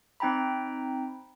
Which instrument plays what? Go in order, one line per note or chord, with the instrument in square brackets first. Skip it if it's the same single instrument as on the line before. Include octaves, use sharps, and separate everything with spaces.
[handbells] C4 D#4 G5 A#5 B5